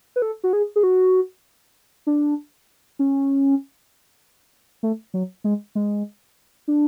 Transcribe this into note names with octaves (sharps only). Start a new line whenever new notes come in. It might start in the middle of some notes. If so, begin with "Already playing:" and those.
B4
A4
F#4
G#4
G#4
F#4
D4
C#4
A3
F#3
G#3
G#3
D4